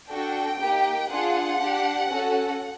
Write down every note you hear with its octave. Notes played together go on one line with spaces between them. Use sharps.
D4 F#4 A4 G5
A#3 D#4 G4
D4 F4 G#4 F#5
D4 G4
C#4 F#4 A4